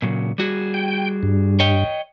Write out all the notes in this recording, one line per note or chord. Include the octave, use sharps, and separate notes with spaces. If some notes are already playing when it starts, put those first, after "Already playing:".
A#2 C#3 F#3
G3 F#4 G#4
G5
G2
C#5 D#5 G5